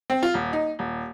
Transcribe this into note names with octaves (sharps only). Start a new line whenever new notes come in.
C4
F4
D#1
D#4
D#1